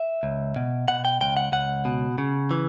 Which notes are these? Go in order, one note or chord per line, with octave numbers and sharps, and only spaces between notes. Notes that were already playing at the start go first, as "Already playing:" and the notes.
Already playing: E5
C#2
B2
B2 F#5
G5
C#2 G5
F#5
C#2 F#5
B2
C#3
E3